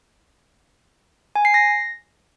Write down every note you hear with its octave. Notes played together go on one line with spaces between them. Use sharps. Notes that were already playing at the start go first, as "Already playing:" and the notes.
G#5
C7
A#6